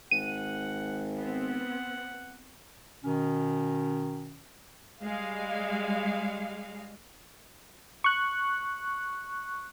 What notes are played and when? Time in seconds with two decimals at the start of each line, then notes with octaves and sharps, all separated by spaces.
0.11 G#1 F#5 D#7
1.18 B3 C4 F#5
3.05 B2 D#3 C#4
5.03 G3 G#3 F5
8.04 C#6 F#6